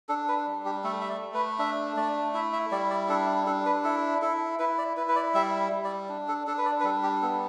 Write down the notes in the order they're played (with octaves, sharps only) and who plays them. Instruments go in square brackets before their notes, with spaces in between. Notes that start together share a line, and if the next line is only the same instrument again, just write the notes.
[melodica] D4 A4
B4
G3
G4
A3 A4
E5
D5
A3
B4
D4 E5
A3 D5
E4 E5
E5
G3 D5
D5
D4 A4
D4 A4
B4
E4 A4
E4 A4
E4 B4
D5
E4 B4
B4
D5
G3 E5
G3
D5
D4
A4
D4 A4
B4
D5
B4
G3 A4
G4
B3 A4